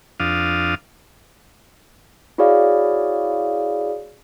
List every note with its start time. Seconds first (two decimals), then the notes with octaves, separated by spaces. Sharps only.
0.20 F2 D4 F5 D#6
2.38 E4 F#4 G#4 C#5 D5 F5